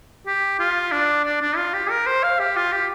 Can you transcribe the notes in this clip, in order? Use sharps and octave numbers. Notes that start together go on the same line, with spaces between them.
G4
F4
D4
D4
D4
F4
G4
A#4
C5
F5
G4
F4
G4